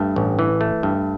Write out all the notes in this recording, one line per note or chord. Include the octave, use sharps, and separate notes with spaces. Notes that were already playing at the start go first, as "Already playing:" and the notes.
Already playing: G2 A3
A1
E3
A3
G2